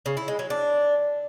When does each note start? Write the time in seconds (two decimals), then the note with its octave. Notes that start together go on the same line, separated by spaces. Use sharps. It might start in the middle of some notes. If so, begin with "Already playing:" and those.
0.06 C#3
0.17 E4
0.28 G#3
0.39 F#3
0.50 D4